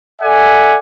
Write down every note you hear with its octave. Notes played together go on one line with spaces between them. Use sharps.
A4 D5 E5 F#5 G#5